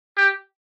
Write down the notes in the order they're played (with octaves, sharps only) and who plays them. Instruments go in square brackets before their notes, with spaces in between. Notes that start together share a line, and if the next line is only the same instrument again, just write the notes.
[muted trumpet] G4